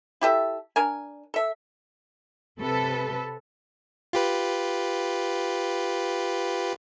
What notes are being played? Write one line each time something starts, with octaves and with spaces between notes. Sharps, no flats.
E4 G4 A4 E5
D4 A#4 G#5
A4 E5
C3 A4 B4
F4 G4 B4